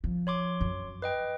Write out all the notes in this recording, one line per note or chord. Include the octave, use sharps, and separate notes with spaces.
F3
C#5 C6 D6
F#2
B4 D#5 G5